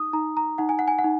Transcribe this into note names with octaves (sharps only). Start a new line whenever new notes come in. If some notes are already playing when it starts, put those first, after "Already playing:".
Already playing: D#4 D#6
D#4 A#5
A#5
D#4 F#5
G#5
F#5
G#5
F#5
D#4